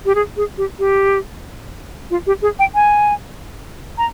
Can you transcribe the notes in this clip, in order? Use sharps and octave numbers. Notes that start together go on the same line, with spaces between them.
G4
G#4
G#4
G4
G4
F4
G4
G#4
G5
G#5
A#5